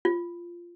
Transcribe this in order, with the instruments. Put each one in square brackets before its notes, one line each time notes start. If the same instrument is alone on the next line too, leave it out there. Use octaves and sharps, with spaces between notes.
[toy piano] F4